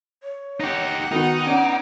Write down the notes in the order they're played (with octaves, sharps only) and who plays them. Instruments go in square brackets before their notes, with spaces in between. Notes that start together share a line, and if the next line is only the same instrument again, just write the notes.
[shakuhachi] C#5
[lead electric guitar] D#4 G4 [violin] F#5
[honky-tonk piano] D#3 B3 [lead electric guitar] D#4 [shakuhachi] F#4
[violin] B3 D6 [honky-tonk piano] C#4 D4 [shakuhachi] F#5